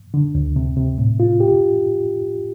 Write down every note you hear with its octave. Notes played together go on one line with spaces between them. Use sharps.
D3
D2
C3
C3
A2
F4
G4